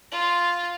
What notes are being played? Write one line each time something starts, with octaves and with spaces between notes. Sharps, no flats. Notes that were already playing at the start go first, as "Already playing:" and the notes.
F4